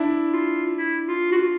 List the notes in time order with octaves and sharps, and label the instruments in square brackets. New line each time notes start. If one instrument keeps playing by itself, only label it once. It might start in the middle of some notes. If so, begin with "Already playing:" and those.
Already playing: [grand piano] D4 E4
[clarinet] F4
E4
F4
F#4
F4